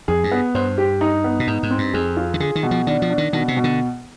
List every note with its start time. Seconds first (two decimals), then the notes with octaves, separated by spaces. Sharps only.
0.08 F2 G#4
0.24 G2
0.32 B3
0.55 G2 C5
0.78 G4
1.01 D#4
1.24 B3
1.40 B2
1.47 G#2 D#4
1.63 G#2
1.71 C4
1.78 G2
1.94 F2 G#4
2.17 F4
2.34 D#3
2.40 D3 G#4
2.55 D#3
2.63 B2
2.71 F3
2.87 D#3 D4
3.02 F3
3.10 D4
3.18 D#3
3.33 B2 D#3
3.48 C3
3.56 B2
3.64 D3